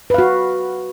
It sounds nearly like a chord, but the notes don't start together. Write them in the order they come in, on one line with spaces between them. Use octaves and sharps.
B4 F5 F#4